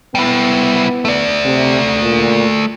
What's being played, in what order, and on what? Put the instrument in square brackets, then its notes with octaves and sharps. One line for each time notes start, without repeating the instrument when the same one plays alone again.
[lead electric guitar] G3 E4 [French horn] B3
[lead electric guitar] A3 D5
[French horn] C3
A#2